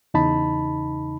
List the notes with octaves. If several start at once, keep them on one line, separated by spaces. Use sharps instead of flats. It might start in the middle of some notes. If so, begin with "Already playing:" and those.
E2 C#3 D#4 A5 B5